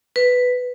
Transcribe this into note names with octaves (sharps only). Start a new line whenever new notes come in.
B4